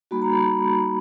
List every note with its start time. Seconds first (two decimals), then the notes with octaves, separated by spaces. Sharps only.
0.11 G3 A#3 D#4 F#4 B5
0.22 A#5
0.32 B5
0.43 B5